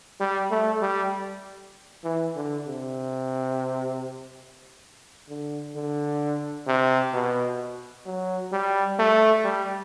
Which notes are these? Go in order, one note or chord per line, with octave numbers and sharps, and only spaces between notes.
G3
A3
G3
E3
D3
C3
D3
D3
C3
B2
F#3
G3
A3
G3